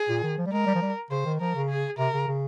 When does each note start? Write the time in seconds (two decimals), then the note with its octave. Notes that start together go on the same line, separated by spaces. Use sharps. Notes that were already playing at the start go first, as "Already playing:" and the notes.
Already playing: G#4
0.09 A#2
0.23 D#3
0.38 F3
0.46 G3
0.52 G#3 A#4
0.66 G3
0.75 F3
0.82 G3
1.11 C#3 C5
1.26 D#3
1.40 F3 A#4
1.55 C#3
1.70 G#4
1.98 C3 A#4
2.14 C#3
2.28 C#3